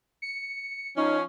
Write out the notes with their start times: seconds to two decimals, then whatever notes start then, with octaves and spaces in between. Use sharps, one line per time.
0.22 C#7
0.97 F3 C#4 D#4